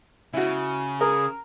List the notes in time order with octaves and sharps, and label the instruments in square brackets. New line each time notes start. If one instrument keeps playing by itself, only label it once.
[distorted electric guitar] C#3 [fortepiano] E4 F#4
[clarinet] G#4 [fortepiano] A#4